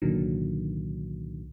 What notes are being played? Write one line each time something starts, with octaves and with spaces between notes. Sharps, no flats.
C2 A#2 D3 D#3 F#3